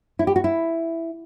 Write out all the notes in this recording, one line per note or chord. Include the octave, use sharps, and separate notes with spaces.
E4
G4
F#4
E4